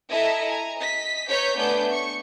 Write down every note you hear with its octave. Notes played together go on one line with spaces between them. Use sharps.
E4 A4 D#5 E5 A#5
G#5 A#5
D#5 B6
B4 C#5 A#5 G6 B6
A3 B3 D4 G#5 G6
C#6